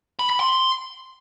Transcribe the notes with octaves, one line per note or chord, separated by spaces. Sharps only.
B5
B5
C6